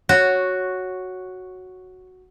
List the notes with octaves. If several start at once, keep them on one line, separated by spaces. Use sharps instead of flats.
F#4 C#5